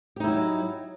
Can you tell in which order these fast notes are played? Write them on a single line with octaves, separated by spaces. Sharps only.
G4 D#4 E4 F#3